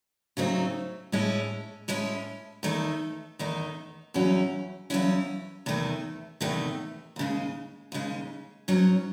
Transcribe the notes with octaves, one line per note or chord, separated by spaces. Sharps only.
C#3 F#3 A3 C4 D#4
A2 G#3 C#4 E4
A2 G#3 C#4 E4
E2 D#3 A3 D#4
E2 D#3 A3 D#4
E2 C#3 F#3 C#4 E4
E2 C#3 F#3 C#4 E4
E2 C3 D#3 A3
E2 C3 D#3 A3
D#2 C#3 G#3
D#2 C#3 G#3
G#2 F#3 C#4